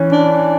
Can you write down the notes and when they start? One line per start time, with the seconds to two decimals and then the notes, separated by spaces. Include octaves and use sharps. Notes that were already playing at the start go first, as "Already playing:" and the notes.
Already playing: E3 C#4
0.12 D4